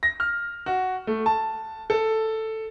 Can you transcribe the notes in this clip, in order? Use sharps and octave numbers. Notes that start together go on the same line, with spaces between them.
A#6
F6
F#4
A3
A5
A4